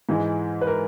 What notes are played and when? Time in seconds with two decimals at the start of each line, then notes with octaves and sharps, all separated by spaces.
0.09 G#2 E3 G#3
0.61 B4
0.67 A#4